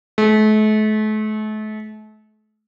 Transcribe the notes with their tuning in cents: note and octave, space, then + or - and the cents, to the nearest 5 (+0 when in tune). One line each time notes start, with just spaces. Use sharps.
A3 -40